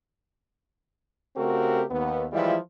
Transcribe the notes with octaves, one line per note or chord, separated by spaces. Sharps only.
C#3 A3 C4 F#4 G4 A#4
D#2 B3
E3 F3 G3 G#3 E4 F4